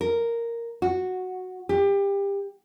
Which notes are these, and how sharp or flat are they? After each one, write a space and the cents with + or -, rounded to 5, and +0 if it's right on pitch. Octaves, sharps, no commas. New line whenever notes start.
A#4 -5
F#4 -5
G4 +25